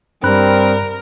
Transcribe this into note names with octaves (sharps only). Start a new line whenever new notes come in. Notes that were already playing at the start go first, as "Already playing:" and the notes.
G2 G3 C4 A#4 B5 F#6